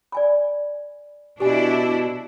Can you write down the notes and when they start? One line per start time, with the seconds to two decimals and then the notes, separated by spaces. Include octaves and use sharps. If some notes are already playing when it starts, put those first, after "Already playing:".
0.12 D5 G#5 B5
1.40 B2 D4 E4 G4 G#5